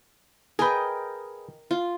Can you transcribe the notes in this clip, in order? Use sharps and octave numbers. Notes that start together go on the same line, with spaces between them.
G#4 A#4 B4 D#5 G5
F4